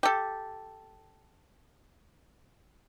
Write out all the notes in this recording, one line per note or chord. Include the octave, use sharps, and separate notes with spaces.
G4 A4